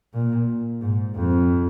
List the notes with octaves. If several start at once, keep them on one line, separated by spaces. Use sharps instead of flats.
A#2
G#2
F2